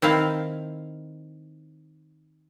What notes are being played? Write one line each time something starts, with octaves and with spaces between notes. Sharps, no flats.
D#3 C4 E4 F5